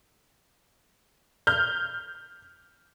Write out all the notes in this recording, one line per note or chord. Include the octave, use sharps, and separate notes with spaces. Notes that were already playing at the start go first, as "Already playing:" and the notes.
F6 G6